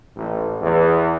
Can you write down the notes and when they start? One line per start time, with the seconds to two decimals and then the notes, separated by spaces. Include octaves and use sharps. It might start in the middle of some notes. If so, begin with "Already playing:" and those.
0.15 A1
0.60 E2